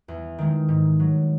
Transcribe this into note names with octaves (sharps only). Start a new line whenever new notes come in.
E2
D#3 G#3
G#2
F#3